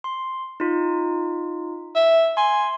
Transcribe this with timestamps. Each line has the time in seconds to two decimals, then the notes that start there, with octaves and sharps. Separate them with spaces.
0.04 C6
0.60 D#4 F4
1.95 E5
2.37 G#5 C6